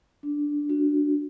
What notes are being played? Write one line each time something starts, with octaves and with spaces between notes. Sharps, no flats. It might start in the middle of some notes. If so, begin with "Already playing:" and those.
D4
D4 F#4